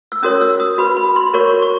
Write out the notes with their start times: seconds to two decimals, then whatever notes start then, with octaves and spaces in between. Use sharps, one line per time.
0.12 E6
0.23 C#4 F#4 A#4 C#5 D#6
0.41 E6
0.60 D#6
0.78 F#4 B4 B5
0.97 B5
1.16 C6
1.34 F#4 A#4 C#5 C#6
1.62 C#6